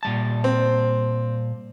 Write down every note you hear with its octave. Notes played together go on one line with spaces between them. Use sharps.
A#2 G3 A5
C4